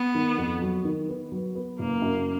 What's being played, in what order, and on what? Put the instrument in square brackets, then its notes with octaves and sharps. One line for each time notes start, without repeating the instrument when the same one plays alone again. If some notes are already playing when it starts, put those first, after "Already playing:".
Already playing: [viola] B3
[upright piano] D#3
F2
F#3
D#3
B3
F#3
B3
[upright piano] F#1 [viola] A#3
[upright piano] F#2